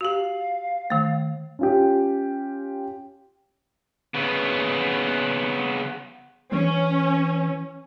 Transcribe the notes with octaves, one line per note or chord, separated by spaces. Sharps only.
F#4 G4 F5
D#3 A3
C#4 F4 G4
C#3 B3
E3 C#4